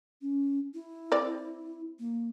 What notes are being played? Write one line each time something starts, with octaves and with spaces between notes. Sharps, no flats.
C#4
E4
C4 D5
A#3